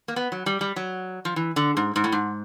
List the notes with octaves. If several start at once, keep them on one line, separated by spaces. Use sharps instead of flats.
A#3
B3
F#3
G3
G3
F#3
F3
E3
D3
G#2
G#2
A2
G#2